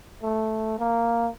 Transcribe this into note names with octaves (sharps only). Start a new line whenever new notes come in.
A3
A#3